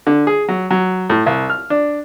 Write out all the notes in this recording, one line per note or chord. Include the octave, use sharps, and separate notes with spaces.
D3
G#4
F#3
F#3
A2
C2
F6
D4